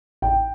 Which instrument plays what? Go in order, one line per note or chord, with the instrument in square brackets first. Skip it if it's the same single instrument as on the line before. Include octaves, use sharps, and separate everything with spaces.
[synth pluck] A1 [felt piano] G5